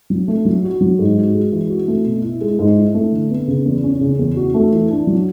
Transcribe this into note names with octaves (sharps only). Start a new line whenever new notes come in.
F#3
A3
F#3
F#4
F#3
G#2
F#4
G#3
E3
F#4
A3
B2
E4
G#3
G#2
E4
A3
D3
B3
C#3
E2
C#4
C#3
E2
F#4
A3
E3
D4
F#3